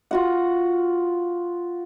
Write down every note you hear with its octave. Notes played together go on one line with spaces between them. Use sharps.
F4 F#4 F#5